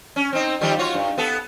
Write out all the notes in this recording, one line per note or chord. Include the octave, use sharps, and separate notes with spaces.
C#4
C4 D#4
D#3 F3 G3
F4 F#4 C#5
G2
B3 A4